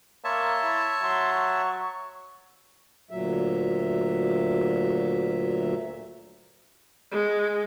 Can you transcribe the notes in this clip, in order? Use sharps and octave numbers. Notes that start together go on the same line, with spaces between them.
A#3 C#5 E5 A5 C6
E4
F#3 C6
C#6
D2 A#2 F#3 E5
G#3